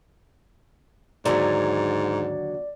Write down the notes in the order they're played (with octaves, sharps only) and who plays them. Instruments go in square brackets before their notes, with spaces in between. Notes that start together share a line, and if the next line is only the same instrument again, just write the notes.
[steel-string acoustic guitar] D#2 D3 F#3 [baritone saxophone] G#2 [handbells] D5